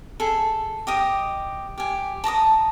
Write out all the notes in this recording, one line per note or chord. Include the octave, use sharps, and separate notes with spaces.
G#4 A4
G4 D#5 D#6
G4 G#5
A5 A#5 D6 D#6